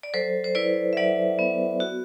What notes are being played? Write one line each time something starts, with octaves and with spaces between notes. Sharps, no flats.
D5
F#3 A4 C5
C5
E4 B4 D5
E5
F#3 D5 F#5
B3
F#4